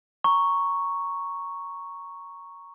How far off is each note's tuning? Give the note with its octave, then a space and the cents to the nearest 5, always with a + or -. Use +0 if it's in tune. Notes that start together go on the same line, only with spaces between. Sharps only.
A#5 +0 C#6 +0